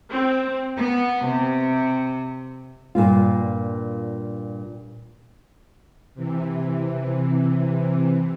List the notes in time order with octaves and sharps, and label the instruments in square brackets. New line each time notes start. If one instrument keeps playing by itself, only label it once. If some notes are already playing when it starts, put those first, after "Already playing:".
[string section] C4
B3
C3
[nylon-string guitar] G2 A#2 A#3 F4
[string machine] C3 E3